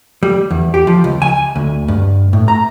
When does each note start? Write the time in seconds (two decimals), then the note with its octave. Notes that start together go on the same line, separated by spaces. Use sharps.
0.23 G3
0.51 E2
0.74 G4
0.87 F3
1.04 C#2
1.22 G#5
1.56 D2
1.88 G2
2.33 A2
2.48 A#5